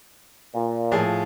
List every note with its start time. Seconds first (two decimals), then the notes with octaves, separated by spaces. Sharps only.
0.55 A#2
0.91 A2 F3 G#4